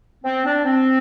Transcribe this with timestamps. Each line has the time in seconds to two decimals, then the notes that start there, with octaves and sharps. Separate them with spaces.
0.24 C4
0.45 D4
0.65 C4